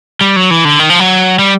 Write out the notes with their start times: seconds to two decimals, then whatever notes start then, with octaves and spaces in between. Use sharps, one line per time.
0.21 G3
0.36 F#3
0.51 E3
0.65 D3
0.79 D#3
0.90 F3
1.00 F#3
1.39 G3